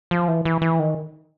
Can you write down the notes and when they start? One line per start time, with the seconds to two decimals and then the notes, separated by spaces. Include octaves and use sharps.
0.11 F3
0.28 E3
0.45 E3
0.62 E3
0.79 D#3